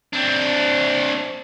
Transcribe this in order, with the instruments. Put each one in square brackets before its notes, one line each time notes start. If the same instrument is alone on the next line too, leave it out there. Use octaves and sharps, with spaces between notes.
[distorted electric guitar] C4 D4